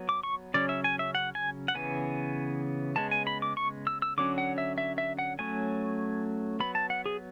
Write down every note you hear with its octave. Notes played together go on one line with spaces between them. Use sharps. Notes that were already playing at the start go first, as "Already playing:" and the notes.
Already playing: F#3 B3
D6
C#6
C#3 F#3 C#4 D5
E5
G#5
E5
F#5
G#5
F#5
C#3 E3 B3 G#5
C#3 G#3 B3 A5
G#5
B5
D6
C#6
E6
E6
D3 F#3 C#4 D6
F#5
E5
E5
E5
F#5
F#3 A3 C#4 G#5
F#3 B3 B5
A5
F#5
G#4